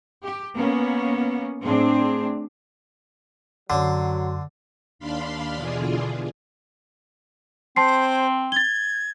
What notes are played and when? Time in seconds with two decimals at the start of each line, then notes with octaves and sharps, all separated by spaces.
0.23 G4
0.56 A#3 B3 C#4
1.62 A2 C4 D4 G#4
3.70 F#2 D3 F#3 C6
4.99 D#2 D4 F5 B5 C6
5.56 B2 D3 E3 D4 F4 G#4
7.76 C4 C5 A5 C6 C7
8.52 G#6 A6 G7